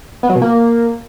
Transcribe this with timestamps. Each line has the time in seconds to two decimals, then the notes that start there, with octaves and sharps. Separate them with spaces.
0.23 B3
0.29 F#3
0.35 B2
0.42 A#3